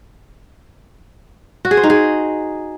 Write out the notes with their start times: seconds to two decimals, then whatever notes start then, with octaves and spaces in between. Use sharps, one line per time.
1.65 F#4
1.71 G#4
1.77 C5
1.83 D#4
1.90 G#4